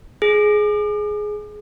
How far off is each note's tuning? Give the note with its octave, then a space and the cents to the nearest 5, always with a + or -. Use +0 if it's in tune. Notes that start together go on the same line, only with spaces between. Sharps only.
G#4 +15